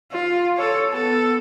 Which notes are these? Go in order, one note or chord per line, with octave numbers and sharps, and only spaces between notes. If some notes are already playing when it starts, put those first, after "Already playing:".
F4
A4 C#5
B3 A4